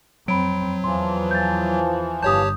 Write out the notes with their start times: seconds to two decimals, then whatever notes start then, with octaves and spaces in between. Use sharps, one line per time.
0.28 F2 F#3 C4 B5 D7
0.84 E2 E3 F3 C6
1.31 G6 A6
2.22 G1 G4 C#5 A5 D#6 G6